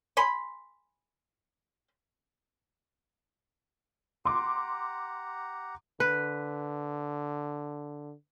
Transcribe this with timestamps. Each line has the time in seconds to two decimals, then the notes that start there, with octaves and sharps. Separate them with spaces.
0.17 G#5 B5 C6
4.25 G4 F#5 A#5 C6 D6
6.00 D3 B4